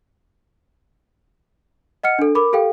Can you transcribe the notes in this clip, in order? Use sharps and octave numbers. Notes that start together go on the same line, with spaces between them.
D#5 F#5 F6 C#7
D4 A4
A#4 B5 D6
G4 A4 F5 G5